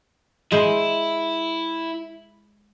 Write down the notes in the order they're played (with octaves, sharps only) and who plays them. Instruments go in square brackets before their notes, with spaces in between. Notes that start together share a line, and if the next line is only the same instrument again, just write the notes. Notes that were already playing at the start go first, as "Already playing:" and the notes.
[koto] G#3 C5 [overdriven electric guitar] E4